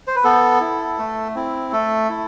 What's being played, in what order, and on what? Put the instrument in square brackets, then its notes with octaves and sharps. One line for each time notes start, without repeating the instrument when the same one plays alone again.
[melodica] C5
B4
B3 A4
E4
A3
C4 E4
A3 A4
E4